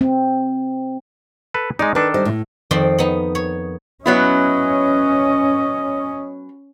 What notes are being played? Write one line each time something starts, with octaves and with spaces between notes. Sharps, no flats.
C4
A4 B4
G#3 D#4 D5
D#3 D4 A4 B4
G3 C5 D#5
A2
F2 D#3 C4 D5 C6
B3 D#4
C#5
F#3 B3 C#4 E4 D#5